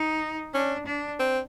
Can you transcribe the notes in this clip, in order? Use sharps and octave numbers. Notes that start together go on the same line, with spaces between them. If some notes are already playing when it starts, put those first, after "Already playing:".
Already playing: D#4
C#4 D4
D4
C4